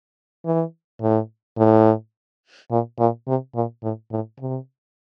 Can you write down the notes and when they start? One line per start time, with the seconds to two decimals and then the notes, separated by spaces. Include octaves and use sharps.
0.45 E3
1.02 A2
1.58 A2
2.71 A#2
2.99 A#2
3.28 C3
3.55 A#2
3.83 A2
4.11 A2
4.40 C3